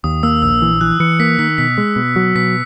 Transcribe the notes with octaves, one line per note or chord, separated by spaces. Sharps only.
D#2 D#6
A#3 E6
A#1 E6
E3
E3 F#6
E3 C#7
A#3 B6
D#3 B6
B2 B6
G#3
B2
F#3
B2 B6